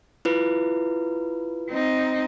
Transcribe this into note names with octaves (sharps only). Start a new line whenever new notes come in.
E4 F4 B4
C4 D#4